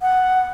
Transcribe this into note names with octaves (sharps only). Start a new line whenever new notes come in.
F#5